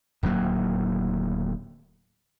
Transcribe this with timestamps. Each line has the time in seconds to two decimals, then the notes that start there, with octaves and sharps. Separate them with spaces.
0.23 D1 D#2 F#3 A#3